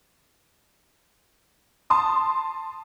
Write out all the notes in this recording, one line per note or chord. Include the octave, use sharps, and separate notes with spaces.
A5 C6 D#6